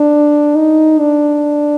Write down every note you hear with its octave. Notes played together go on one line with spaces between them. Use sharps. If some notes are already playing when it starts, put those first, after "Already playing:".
Already playing: D4
D#4
D4